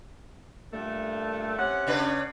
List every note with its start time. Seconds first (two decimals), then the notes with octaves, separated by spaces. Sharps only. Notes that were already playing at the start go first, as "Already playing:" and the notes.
0.74 G2 A#2 A3
1.59 C3 C#4 F#5
1.87 C#3 D4 B4